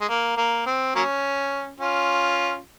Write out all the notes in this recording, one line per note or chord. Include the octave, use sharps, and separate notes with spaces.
G#3
A#3
A#3
C4
F#3 A#3 C#4
C#4 F4